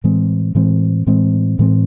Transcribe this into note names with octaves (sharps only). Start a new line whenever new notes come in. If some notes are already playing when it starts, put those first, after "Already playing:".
A2 E3 G#3 C4
A2 E3 G#3 C4
A2 E3 G#3 C4
A2 E3 G#3 C4